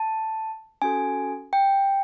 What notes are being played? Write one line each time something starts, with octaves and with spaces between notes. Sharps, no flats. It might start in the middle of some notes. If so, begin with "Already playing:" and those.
Already playing: A5
C#4 F#4 A4 G#5
G5